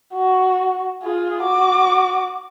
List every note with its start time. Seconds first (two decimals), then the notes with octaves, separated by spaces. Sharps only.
0.14 F#4
1.03 F4 G#4
1.43 F#4 D6